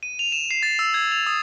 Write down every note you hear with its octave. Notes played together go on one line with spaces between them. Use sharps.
D#7
F7
E7
C7
A6
E6
G#6
F7
D#6